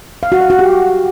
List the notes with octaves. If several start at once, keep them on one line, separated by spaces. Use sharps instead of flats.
F5
F#4
F5
F#4
G4